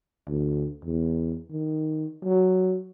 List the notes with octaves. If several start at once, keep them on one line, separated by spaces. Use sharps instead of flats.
D2
E2
D#3
F#3